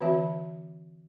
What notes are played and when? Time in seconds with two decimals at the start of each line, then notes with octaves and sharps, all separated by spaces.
0.01 D3 E3 C4 F#4 E5